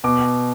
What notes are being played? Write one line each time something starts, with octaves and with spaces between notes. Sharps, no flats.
B2 D6